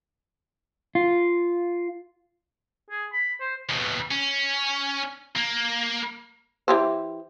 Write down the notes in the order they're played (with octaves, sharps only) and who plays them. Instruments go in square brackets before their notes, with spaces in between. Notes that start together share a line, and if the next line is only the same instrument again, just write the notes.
[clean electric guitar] F4
[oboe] G#4
B5
C5
[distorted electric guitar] D#2 B2
C#4
A#3
[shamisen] E3 G4 C5